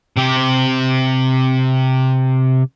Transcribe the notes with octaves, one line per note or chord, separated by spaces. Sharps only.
C3 G4